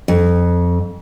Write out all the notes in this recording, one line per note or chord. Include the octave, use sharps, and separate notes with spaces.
F2